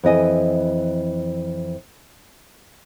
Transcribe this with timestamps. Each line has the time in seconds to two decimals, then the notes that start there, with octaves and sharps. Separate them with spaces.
0.03 F2 E3 D#5 G#5